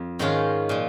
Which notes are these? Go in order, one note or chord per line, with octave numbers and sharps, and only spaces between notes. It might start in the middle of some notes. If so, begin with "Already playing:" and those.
Already playing: F2
G#2 D#3 G#3 C#4 F4
A#2 F3